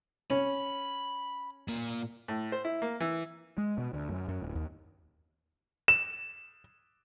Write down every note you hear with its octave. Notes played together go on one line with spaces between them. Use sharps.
C#4 B5
A#2 A#3
A2
C5
E4
A#3
E3
G#3
B2
D2
F#2
F#2
D1
D#2
E7